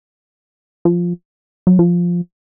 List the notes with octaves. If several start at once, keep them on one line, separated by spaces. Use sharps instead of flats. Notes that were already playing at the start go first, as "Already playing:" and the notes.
F3
F#3
F3